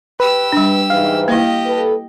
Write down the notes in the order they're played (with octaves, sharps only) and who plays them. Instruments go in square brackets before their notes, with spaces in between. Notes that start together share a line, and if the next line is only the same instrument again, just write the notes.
[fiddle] G4 E6 [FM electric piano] B4
[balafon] G3 D4
[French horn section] G#2 E3 [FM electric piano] F5
[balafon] A#3 E4 [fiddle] G4 D#5
[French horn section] A4 B4